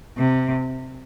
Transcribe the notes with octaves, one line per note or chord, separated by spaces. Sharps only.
C3